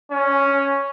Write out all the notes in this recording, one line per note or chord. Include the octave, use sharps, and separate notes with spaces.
C#4